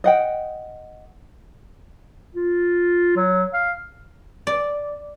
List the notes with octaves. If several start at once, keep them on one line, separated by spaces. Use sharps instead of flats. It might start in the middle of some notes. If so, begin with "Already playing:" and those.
D#5 F#5 G5
F4
F#3
F5
D5